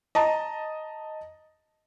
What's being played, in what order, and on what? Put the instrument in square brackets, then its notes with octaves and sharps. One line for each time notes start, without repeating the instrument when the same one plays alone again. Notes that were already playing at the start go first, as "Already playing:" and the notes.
[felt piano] D#5 A5 A#5